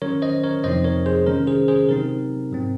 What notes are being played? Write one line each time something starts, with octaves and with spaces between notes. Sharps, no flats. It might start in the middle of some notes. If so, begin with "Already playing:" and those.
D#3 F#3 C#4 A#4 C#5
C5 D#5
A#4 C#5
F2 C3 F3 C4 D#4 C5 D#5
A#4 C#5
G#4 C5
C3 D#3 G#3 C#4 A#4
G#4 C5
G#4 C5
C3 F#3 C4 D#4 A#4
G#2 F#3 C4